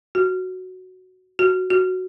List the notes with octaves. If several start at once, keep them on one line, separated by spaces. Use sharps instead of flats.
F#4
F#4
F#4